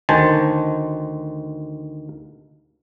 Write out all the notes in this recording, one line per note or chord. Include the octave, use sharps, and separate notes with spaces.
D2 D#3 C5 G#5 A5